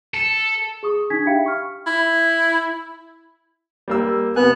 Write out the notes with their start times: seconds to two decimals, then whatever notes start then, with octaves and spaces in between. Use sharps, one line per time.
0.14 A4
0.83 G#4 C#6 D#6
1.10 D4 D#4 G#5 G#6 B6
1.26 G4 E5 F5 G5 B5 C#7
1.46 C#6 F6
1.87 E4
3.88 G3 A#3 E6
4.36 C3 B3 G#5 F#6